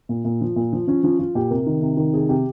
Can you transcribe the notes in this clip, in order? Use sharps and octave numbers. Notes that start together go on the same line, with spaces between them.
A#2
A#2
F3
A#2
F3
F3 C#4
F3 C#4
F3 F4
A#2 G4
C3 A#4
D#3
C3
D#3
C3 G#4
C3 G4